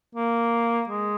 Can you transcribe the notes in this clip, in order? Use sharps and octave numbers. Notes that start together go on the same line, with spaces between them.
A#3
G#3